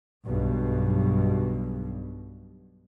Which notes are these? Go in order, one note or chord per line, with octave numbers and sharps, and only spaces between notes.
B1 G2 B2